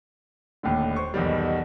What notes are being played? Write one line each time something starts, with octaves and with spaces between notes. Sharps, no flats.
D#1 D#2 A2 D3
C5 C#6
B1 E2 B2 D#3 G3